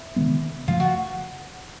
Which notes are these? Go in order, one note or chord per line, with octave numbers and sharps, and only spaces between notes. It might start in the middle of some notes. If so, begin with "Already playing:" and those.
Already playing: E4
C3 D#3 G#3 B3
F#2 C#3 F3 A3 F4
F#4